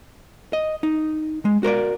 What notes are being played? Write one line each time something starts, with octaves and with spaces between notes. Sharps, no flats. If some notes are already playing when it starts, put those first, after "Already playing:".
D#5
D#4
G#3
F#4 A#4 C5 D5